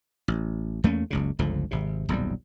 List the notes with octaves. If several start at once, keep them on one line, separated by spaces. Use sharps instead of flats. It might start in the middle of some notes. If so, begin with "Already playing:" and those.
A1
E2 A3 A#3 C#4
F#1 C#2 C#3
G1 C#2 D3 F3
G#1 C3
D#1 B1 F2 G3